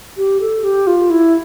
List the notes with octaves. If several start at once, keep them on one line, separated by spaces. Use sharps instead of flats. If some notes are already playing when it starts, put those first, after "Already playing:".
G4
A4
G4
F4
E4